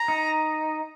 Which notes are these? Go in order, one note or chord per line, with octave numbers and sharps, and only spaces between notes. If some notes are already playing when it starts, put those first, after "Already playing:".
Already playing: A#5
D#4